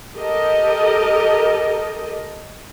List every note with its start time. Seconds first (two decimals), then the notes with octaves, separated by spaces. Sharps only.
0.16 G4 A4 A#4 D#5